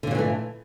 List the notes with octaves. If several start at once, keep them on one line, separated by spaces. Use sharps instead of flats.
A#2 D3 E3 F#3 A3